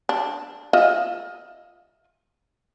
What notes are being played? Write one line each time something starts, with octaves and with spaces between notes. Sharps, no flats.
D4
F4 D#5 E5